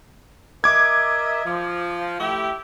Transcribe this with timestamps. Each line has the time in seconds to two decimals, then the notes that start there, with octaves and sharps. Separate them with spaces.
0.64 A#4 D#5 E5 D6 G#6
1.46 F3
2.20 A3 E4 G4